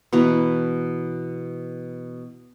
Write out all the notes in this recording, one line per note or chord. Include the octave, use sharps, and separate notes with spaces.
B2 E3 B4 A#5